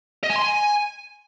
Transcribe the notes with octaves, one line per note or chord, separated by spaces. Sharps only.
D#5
G#5
C6
G#5